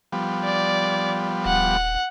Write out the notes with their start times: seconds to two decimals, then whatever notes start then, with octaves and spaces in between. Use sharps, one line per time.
0.12 F3 G3 B3
0.45 D5
1.45 D#1 F#5